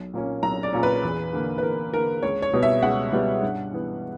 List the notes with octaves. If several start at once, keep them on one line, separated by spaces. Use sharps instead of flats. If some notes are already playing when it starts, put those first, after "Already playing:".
Already playing: B1
A#2 A#3 C#4
B1 A#5
D5
A#2 A#3 C#4
B4
E2
D3 A#3
B4
E2 A#4
D3 A#3 A#4
C#2 C#5
C#5
B2 G3 B3
E5
C#2 F#5
B2 G3 B3
G2
E3 B3